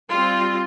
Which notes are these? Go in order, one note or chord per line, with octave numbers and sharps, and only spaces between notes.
G3 C4 F4